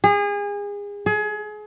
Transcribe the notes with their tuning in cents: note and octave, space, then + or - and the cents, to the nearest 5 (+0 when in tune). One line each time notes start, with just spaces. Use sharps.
G#4 -30
G#4 +30